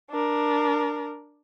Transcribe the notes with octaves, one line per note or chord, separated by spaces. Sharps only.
D4 A#4